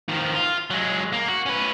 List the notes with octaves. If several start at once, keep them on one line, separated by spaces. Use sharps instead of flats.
D#3 F3
F4
F#3 G#3
A#3
F#4
C#4 B4